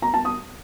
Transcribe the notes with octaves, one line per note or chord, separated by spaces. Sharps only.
A#5
A5
D#6